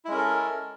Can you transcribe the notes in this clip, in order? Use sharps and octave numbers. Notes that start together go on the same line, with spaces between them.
G#3 C#4 E4 A4 A#4